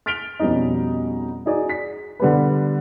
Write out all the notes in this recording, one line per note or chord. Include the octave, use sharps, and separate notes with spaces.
F6 A6 B6 D7 F7 G7
F2 B2 G3 C#4 D#4
D#4 F#4 G#4 D5
B6
D3 G3 B3 B4